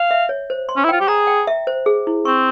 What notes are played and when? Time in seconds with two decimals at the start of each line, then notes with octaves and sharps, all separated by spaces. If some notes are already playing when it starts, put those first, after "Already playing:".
Already playing: F5
0.11 E5
0.29 C#5
0.50 C5
0.69 C6
0.77 C#4
0.85 E4
0.89 F4 G5
1.01 G4
1.08 G#4 A#5
1.27 G5
1.47 E5
1.67 C5
1.86 G#4
2.07 E4
2.25 C4 C#6